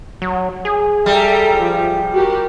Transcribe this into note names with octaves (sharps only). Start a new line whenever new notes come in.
F#3
G#4
G3 A4 E5 A#5
F3
F#4 G4 A#4